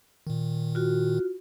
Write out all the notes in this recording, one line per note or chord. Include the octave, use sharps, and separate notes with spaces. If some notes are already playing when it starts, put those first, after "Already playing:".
A#2 D#3
F4 F#4